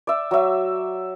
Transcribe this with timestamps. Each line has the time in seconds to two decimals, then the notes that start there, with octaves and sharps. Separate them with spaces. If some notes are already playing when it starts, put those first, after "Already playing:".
0.07 D5 E5
0.31 F#3 E5